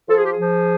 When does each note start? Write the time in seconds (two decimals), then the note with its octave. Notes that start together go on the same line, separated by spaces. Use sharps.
0.09 F3 A4
0.17 G#4
0.24 G4
0.31 G#4
0.39 F3